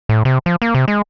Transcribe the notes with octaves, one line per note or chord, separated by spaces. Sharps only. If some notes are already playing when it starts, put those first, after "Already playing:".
A2
C3
F3
A#3
C3
G#3